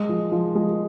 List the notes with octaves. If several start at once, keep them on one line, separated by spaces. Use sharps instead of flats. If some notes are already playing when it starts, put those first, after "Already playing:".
Already playing: G#3
F3
F3
G#3